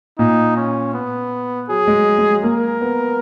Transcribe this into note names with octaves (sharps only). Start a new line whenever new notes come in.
A#2 D#4
C#4
B3
F#3 G#4
G#3
G#3
F#3
A#3 A#4
B3